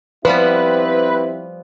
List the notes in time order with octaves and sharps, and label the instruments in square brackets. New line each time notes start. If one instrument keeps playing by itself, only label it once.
[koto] F3 G3 B3 [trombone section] C4 E4 G4 [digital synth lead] B4